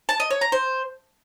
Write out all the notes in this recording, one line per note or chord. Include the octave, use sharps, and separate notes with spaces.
A5
D#5
C#5
A#5
C5